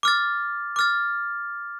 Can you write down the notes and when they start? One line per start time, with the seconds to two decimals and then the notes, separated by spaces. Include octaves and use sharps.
0.03 D6 F6 A6
0.76 D6 F6 A6